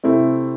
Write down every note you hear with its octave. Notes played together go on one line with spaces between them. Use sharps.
C3 A3 C4 E4